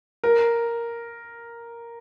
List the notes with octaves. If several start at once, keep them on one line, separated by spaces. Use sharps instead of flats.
A#4